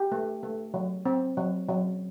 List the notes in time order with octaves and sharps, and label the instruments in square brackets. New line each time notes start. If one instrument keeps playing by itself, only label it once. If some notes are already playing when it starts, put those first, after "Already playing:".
Already playing: [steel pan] G4
A3
A3
F#3
C4
F#3
F#3